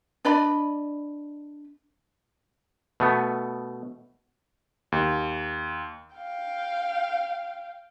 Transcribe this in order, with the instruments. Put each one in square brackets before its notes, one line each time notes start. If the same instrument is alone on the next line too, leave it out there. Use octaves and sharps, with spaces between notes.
[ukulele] D4 D5 D#5 B5
[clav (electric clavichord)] B2 A3 B3
[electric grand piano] D#2
[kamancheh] F5 G5